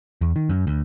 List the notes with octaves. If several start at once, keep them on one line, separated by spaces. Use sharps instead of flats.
E2
D#3
F#2
D2